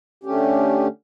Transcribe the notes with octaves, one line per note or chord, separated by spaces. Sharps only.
D3 A3 C#4 G4